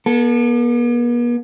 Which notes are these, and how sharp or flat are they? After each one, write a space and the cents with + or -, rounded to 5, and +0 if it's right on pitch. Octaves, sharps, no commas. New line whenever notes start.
B3 -45 A4 +0